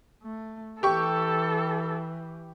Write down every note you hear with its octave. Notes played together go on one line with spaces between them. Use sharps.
A3
E3 G4 A4 C#6